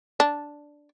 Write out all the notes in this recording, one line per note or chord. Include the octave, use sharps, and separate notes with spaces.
D4